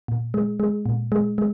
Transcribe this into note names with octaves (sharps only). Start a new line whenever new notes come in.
A#2
G#3
G#3
A#2
G#3
G#3